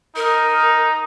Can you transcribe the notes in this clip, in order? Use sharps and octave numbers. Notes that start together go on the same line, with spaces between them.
D#4 A#4